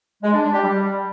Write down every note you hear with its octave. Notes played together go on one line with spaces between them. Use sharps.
G#3
D4
D4
G4
G3